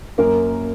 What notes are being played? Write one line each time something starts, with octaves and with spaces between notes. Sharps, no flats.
F#2 A#3 A#4